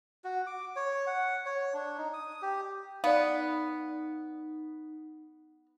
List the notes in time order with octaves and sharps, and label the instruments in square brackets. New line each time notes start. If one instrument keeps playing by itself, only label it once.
[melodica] F#4
D6
C#5
F#5
C#5
D4
D#4
D#6
G4
[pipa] B3 [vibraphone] D#4 [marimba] D5 F5